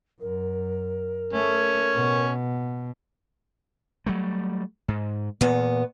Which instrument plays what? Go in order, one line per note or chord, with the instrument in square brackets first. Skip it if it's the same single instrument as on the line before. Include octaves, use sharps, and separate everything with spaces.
[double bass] F#2 [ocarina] A#4
[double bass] A3 [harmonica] C#4
[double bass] B2
[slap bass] F#3 G3 A3
G#2
[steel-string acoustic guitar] E2 B3 [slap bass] A#2